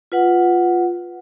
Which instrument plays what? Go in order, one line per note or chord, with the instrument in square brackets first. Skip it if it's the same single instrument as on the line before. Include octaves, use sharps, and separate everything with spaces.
[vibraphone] F4 B4 F#5